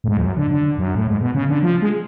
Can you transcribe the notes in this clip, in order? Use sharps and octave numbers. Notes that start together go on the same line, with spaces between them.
A2
G#2
F2
F#2
D3
D3
F#2
A2
G#2
B2
C#3
D3
F3
G#3